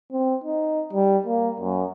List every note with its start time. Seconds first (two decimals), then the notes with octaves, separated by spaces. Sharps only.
0.11 C4
0.44 D#4
0.93 G3
1.26 A#3
1.59 F#2